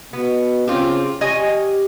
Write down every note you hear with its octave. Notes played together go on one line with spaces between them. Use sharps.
B2 B3
C#3 C4 F4 G4
G4 C#5 D#5 G#5